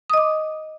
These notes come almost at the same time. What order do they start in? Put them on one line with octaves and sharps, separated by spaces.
D#6 D#5 D6